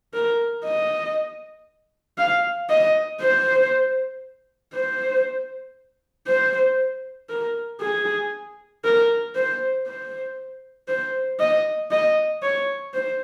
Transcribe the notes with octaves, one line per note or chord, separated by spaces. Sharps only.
A#4
D#5
F5
D#5
C5
C5
C5
A#4
G#4
A#4
C5
C5
C5
D#5
D#5
C#5
C5